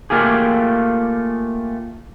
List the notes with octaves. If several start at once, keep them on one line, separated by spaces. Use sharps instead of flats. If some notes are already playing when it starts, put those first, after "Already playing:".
A3 A#3 F4 G4 G#4